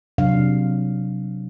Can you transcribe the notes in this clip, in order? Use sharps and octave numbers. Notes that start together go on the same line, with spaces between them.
C3 F#3 D4 F5